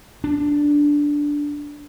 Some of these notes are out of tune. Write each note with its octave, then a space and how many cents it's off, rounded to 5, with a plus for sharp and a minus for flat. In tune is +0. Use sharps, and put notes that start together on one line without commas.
D4 -5